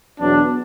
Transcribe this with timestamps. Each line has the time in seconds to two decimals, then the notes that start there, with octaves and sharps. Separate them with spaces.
0.19 E2 B2 F#3 B3 D4